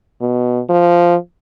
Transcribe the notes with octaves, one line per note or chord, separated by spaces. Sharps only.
B2
F3